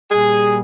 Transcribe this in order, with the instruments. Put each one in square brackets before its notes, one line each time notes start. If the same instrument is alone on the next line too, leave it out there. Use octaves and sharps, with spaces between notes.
[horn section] A#2 G3 G#4